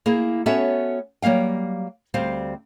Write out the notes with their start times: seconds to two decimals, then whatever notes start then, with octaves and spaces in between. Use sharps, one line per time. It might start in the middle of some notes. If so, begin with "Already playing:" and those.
0.06 A#3 E4 G#4
0.46 B3 C#4 F#4 A4 C#5 E5
1.22 F#3 G3 A#3 F5 G5
2.14 D2 G3 C4 C5 F5